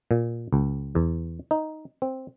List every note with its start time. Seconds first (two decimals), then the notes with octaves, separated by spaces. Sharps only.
0.11 A#2
0.53 C#2
0.95 E2
1.51 D#4
2.02 C4